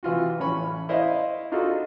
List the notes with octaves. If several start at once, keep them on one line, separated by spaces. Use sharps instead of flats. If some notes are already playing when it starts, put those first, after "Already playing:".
C3 E3 F4 F#4
A1 C#4 C#5 B5 C#6
E4 C5 D#5 F5
D4 D#4 F4 F#4 G#4 A4